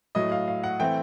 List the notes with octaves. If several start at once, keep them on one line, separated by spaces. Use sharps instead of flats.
A2 F#3 A3 D#5
F5
F5
F#5
E3 A3 C4 G5